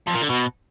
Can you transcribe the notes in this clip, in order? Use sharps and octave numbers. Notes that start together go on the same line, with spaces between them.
F2
A#2
D3
B2